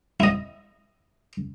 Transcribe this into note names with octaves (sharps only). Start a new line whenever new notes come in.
E4 D#5